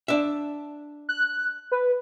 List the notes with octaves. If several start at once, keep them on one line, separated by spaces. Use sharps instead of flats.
D4 E5
F#6
B4